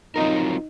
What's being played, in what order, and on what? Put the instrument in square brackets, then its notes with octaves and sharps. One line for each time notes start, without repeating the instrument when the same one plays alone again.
[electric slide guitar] F#3 C4 F4 A#4 [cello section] D#4